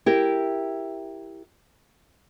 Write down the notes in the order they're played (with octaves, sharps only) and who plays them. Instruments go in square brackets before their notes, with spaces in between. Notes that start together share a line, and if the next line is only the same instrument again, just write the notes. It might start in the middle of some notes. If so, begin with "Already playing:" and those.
[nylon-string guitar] E4 G4 A#4